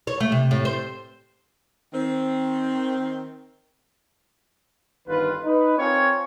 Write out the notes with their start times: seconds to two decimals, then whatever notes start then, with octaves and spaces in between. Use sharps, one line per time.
0.07 C#5
0.20 A3
0.32 C3
0.51 A2
0.65 C5
1.93 D#3 C4
5.08 G1 D#3 F4 B4
5.44 D#4 B4
5.78 C4 F4 A#4 C#5 G#5